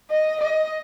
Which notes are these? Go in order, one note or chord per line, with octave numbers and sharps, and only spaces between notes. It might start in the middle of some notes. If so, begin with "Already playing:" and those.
D#5
D#5